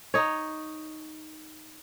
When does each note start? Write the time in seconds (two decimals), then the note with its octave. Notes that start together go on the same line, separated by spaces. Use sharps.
0.14 D#4 C#5